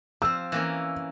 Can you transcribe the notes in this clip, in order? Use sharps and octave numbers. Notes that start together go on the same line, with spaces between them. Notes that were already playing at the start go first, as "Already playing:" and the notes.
F3 C4 E6
E3 A#3 C#4